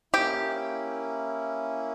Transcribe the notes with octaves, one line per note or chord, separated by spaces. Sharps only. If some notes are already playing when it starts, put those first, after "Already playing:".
A#3 C#4 E4 G4